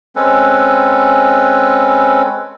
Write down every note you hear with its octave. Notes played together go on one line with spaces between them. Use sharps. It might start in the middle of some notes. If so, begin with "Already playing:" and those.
G#3 C4 C#4 A4 B4